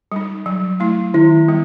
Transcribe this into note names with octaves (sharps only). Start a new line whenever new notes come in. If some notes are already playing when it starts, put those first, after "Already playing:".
G3 D#4
F#3
A3 E4
D#3 E4
G3 B3